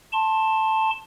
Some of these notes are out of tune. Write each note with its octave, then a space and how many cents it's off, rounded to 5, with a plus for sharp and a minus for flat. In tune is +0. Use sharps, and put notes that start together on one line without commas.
A5 +0 C6 +25